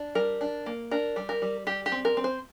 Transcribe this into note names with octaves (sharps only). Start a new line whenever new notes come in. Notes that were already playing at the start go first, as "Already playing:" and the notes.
Already playing: D4
G3 A#4
D4
A#3
D4 A#4
G3
A#4
G3
G3 G4
G4
C4
A#4
C4
C5